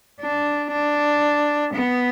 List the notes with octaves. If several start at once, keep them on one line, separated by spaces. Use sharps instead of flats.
D4
D4
B3